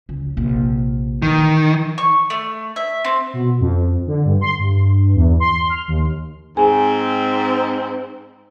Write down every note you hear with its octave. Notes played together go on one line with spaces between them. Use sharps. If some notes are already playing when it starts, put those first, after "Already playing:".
C#2
A#1 C3
D#3 E3
C#6
A3
E5
C4
B2
F2
D3
G2
C6
G2
E2
C6
F6
D#2
G#2 C4 G#4 G#5